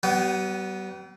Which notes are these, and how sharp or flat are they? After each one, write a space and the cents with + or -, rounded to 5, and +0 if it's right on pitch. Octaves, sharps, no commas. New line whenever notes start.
G3 -45 B3 +0